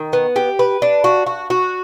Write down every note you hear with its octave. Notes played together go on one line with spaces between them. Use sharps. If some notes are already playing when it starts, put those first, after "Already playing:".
Already playing: D#3
B3
G4
B4
D4
F#4
F#4
F#4